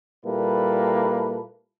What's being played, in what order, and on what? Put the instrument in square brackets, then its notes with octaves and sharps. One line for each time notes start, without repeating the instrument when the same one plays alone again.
[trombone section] A#2 G3 A#3 E4 A4 B4